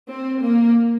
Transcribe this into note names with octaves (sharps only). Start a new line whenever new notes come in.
C4
A#3